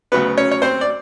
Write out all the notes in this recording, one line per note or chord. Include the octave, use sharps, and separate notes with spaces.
D2 C#3 F#3 B3 B4
C#4 C#5
C#5
C4 C5
D5